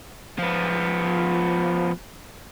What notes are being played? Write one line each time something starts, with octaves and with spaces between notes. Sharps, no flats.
F3 B3